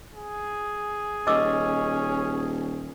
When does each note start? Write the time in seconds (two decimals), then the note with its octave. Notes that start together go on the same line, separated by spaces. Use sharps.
0.14 G#4
1.27 D#1 C#4 D#5 D6 E6